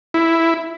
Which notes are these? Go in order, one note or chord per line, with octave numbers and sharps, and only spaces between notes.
E4